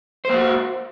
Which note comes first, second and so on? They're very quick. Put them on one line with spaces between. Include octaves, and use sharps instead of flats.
C5 A#3 F#4